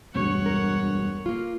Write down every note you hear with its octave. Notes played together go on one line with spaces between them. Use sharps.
E1 D2 G2 C#5 F#5
A#4
A#3 F4